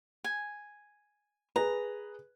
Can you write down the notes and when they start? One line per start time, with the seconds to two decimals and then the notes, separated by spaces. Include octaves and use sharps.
0.24 G#5
1.56 G#4 B4 A#5